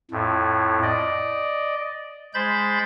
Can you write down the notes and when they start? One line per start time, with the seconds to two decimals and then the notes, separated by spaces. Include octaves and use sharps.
0.11 F2 A2
0.82 D5 D#5
2.34 G#3 C5 B5 G6 A6